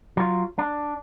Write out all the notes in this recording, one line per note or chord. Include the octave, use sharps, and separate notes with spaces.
F#3 F4
D4